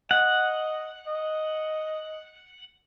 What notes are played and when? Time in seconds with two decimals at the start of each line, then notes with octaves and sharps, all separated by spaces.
0.11 D#5 F#5
1.07 D#5